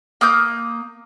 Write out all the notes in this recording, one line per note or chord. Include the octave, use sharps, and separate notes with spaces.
A#3 D#6 G6